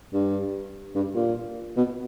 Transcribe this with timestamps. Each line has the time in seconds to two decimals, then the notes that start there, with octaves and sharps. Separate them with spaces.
0.13 G2
0.95 G2
1.15 A#2
1.76 B2